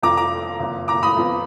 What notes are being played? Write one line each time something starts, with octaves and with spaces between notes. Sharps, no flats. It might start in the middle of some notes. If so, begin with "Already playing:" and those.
F1 F2 F3 A#5 D6
A#5 D6
F#1 F2 F3
A#5 D6
B5 D#6
F2 F3 B3